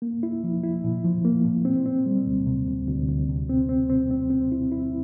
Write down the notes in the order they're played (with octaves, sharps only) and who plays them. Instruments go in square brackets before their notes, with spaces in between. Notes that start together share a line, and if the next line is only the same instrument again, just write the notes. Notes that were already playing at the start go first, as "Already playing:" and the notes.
[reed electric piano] A#3
E4
F3
E4
A#2
F3
A#3
A#2
C4
C4
G3
D2
C3
D2
D2
D2
C3
C4
C4
C4
C4
C4
E4
E4